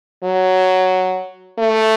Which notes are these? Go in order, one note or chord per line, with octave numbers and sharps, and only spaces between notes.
F#3
A3